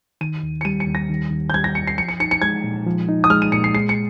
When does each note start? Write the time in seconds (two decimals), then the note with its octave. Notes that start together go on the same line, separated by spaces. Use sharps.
0.21 D#3 D#7
0.43 D#2
0.61 C#7
0.65 G3 D#7
0.80 C#7
0.87 D#2
0.95 A#6
1.09 D#3
1.31 D#2
1.50 G6
1.54 G3 G#6
1.64 A#6
1.75 D#2 C#7
1.87 C7
1.98 F3 C#7
2.09 C#7
2.20 D#4 C#7
2.31 C#7
2.42 G#3 G#6
2.64 A#2
2.86 F3
3.09 D#4
3.24 D#6
3.30 G#3 F6
3.42 D#7
3.52 A#2 C#7
3.64 C7
3.74 G#3 C7
3.89 C#7